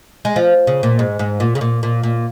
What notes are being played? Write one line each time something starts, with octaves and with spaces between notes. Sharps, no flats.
G#3
F3
C#3
A#2
G#2
G#2
A#2
C#3
A#2
A#2
A#2